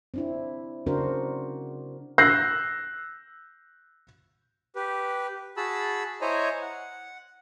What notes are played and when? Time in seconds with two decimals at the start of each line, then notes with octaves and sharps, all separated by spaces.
0.14 C4 D4 E4
0.86 C#3 C4 D4 F#4 A#4 C5
2.18 E6 F#6 G6 A#6 C7
4.76 G4 B4
5.57 F#4 G#4 A5 B5 E6
6.21 E4 C5 C#5 D#5 G#5 A#5
6.62 F#5